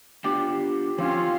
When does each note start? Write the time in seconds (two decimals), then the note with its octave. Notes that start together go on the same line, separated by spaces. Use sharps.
0.24 B3 D4 F4 G4
0.98 F3 C4 C#4 F4 F5